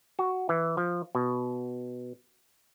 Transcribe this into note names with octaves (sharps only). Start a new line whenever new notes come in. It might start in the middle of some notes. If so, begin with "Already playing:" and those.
F#4
E3
F3
B2